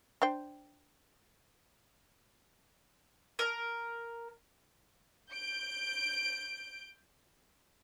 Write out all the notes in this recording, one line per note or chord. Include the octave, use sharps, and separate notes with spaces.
D4 C5 G5
A#4
G6 D7